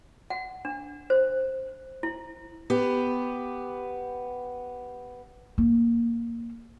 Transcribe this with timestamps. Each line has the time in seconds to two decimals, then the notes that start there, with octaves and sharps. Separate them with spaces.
0.30 F#5
0.65 D4
1.10 C5
2.03 E4
2.70 B3 G4
5.58 A#3